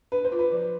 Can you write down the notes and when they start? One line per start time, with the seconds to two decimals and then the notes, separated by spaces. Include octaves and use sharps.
0.12 D4 B4
0.25 C5
0.32 F4
0.39 B4
0.52 F3